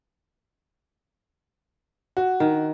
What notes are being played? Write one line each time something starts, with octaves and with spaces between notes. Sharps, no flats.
F#4
D#3